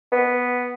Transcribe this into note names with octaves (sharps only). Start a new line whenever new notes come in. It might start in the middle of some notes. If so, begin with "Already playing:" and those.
B3